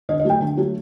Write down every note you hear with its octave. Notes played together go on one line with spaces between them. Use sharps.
D3 D#5
D#5
F#3 A3 G5
D3
F#3 A3